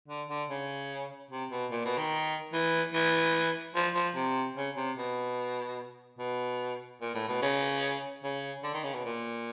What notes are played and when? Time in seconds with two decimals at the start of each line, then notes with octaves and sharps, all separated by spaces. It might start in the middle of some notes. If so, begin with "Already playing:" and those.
0.08 D3
0.29 D3
0.49 C#3
1.31 C3
1.51 B2
1.71 A#2
1.85 B2
1.98 D#3
2.53 E3
2.94 E3
3.75 F3
3.95 F3
4.16 C3
4.56 C#3
4.77 C3
4.98 B2
6.19 B2
7.01 A#2
7.15 A2
7.28 B2
7.42 C#3
8.24 C#3
8.63 D3
8.74 D#3
8.84 C#3
8.94 B2
9.05 A#2